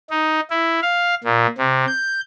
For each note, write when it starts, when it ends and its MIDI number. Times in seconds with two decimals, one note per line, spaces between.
0.10 0.40 63
0.50 0.80 64
0.82 1.15 77
1.24 1.47 46
1.58 1.86 48
1.88 2.21 91